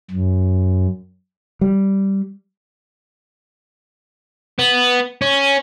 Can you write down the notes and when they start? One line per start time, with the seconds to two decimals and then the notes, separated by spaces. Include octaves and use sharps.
0.11 F#2
1.61 G3
4.59 B3
5.22 C#4